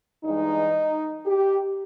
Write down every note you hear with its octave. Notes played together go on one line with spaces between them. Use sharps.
G2 E3 G#3 D#4
G4